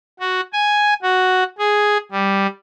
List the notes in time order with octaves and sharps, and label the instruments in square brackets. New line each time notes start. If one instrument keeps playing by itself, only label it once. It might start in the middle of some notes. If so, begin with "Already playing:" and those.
[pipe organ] F#4
G#5
F#4
G#4
G3